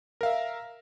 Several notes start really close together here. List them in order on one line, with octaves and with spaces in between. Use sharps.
A#4 F5 E5